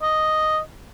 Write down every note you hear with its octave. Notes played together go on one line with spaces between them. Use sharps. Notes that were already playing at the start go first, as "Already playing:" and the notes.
D#5